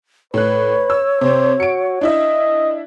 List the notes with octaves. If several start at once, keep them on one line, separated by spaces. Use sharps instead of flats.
A2 B4 C#5 F#6
E6
C3 C4 C5
F#4 C#7 D7
D4 E4 D#5 E5